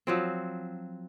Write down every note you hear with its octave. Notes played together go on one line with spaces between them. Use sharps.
F3 F#3 C4